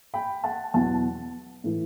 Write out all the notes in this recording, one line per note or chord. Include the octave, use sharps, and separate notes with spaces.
G5 B5
F#5 A5
E2 B2 F#3 F#5 A5
A2 E3